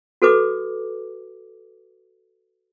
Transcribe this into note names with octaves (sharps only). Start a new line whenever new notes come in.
F#4 A4 B4 D6